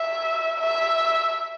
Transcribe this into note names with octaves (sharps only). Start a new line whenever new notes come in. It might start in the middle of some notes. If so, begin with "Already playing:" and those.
Already playing: E5
E5